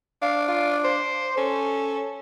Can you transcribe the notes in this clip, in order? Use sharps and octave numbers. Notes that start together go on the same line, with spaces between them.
D4 F5
F4
C5
C#4 A4